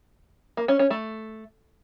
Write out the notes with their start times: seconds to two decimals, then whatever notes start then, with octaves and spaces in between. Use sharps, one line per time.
0.57 A#3
0.68 C#4
0.79 C#4
0.90 A3